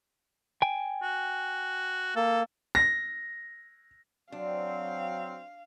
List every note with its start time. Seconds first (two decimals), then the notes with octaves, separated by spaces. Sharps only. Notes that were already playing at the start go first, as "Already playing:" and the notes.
0.62 G5 G#5
1.02 F#4
2.16 A#3 A4
2.75 A#6
4.32 F#3 C4 D4 F5